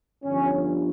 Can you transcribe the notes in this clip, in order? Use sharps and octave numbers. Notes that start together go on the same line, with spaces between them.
G1 G2 D3 F3 C#4